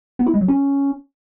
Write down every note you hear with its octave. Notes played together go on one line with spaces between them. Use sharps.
B3
E4
G#3
F#3
C#4